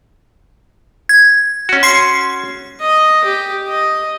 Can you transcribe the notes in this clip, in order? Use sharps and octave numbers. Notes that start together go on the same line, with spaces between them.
G#6
C#4 F#4
C6 C7
D#5
G4
D#5